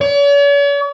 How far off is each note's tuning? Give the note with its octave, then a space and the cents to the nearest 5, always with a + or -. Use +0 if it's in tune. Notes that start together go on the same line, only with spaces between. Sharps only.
C#5 +45